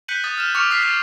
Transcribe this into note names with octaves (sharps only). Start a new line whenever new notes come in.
F#6 G6 B6 C#7 D#7 F#7
D#6 A6 D#7
F6 A6 E7
C#6 D6 F6 C#7 F7
D#6 F6 F#6 B6 C7
F6 A6